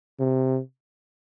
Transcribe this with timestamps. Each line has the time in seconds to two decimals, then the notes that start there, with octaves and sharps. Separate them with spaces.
0.20 C3